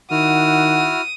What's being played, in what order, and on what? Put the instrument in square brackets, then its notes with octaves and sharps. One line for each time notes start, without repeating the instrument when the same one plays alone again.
[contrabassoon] D#3 [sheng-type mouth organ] E4 F#4 F6 [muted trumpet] F#5 [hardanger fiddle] D#6